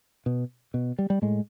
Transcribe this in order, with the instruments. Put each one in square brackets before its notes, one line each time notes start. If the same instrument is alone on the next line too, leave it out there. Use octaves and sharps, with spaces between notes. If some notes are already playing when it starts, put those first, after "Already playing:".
[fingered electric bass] B2
B2
G3
G3
A2 G#3